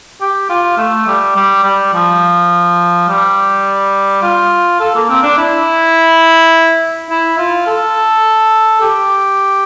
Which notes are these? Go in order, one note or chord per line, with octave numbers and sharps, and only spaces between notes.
G4
F4
A3
G3
G3
G3
F3
G3
F4
A4
A#3
C4
D4
E4
E4
F4
A4
G4